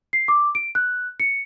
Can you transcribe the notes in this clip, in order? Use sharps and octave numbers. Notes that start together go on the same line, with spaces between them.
C7
D6
D7
F#6
C#7